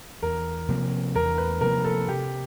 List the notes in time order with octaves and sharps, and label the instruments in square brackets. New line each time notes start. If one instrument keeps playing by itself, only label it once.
[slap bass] E2 [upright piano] A#4
[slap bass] C3 F3 A#3
[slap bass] E2 [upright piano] A#4
[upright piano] B4
[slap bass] C3 F3 A#3 [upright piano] A#4
[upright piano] A4
[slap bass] C3 [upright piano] G4